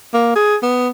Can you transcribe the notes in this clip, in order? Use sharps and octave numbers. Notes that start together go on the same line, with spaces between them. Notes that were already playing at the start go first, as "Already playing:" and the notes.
A#3
G#4
B3